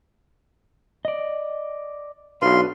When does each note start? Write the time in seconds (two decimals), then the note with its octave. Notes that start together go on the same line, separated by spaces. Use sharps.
1.05 D5 D#5
2.42 B1 D4 B4 F5 C6